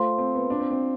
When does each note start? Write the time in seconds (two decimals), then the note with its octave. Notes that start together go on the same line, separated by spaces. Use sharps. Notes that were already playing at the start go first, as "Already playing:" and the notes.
Already playing: A3 F4 C5 F5 C6
0.18 C4
0.35 B3
0.50 D4
0.60 C4
0.71 C4